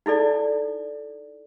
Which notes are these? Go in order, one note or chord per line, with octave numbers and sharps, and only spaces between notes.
D#4 E4 A4 D5